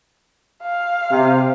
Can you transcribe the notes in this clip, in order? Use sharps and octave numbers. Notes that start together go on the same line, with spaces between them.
F5
C3